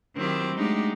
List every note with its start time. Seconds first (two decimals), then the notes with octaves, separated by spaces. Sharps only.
0.15 D#3 F#3 C4 E4 G4
0.54 G#3 A3 D4 D#4 F#4 G4